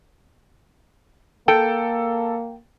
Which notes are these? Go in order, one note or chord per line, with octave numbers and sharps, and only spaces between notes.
A#3 A4 G5